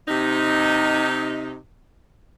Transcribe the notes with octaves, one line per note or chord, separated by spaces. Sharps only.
C3 D#4